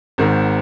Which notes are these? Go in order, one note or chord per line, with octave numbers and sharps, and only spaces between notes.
G#1 G#2 D#3